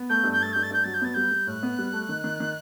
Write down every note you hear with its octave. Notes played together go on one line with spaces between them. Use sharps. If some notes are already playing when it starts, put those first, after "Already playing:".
Already playing: B3
A3 G6
G2
G6
A3 A6
G2 G6
A6
G2 G6
F#3 A6
G6
B3 A6
G3 G6
G3
A2 F#6
B3
G3
A3
D#3
D#3
D#3